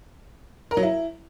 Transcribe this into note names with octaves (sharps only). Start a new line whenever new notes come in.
A#4
F#3
E4